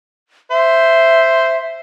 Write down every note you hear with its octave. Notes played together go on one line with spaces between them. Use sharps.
C5 E5